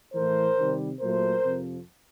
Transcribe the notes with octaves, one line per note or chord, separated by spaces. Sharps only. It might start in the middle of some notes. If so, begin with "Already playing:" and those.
A2 E3 A3 A#4 C5
C3 D#3 G3
A#2 F#3 A3 A#4 C5
F2 C3 F3